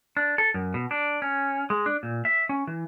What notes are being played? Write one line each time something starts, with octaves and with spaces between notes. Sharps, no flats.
D4
A4
F#2
B2
D4
C#4
G#3
D4
A#2
E5
C#4
E3